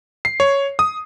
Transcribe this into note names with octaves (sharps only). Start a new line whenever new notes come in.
C7
C#5
D#6